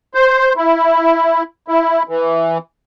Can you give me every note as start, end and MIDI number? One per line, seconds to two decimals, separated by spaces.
0.14 0.53 72
0.57 1.43 64
1.68 2.03 64
2.09 2.58 52